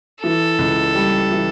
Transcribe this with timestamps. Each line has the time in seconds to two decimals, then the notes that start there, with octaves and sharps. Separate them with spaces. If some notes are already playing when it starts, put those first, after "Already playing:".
0.23 E3 A4
0.59 C#2
0.95 G3
1.31 E3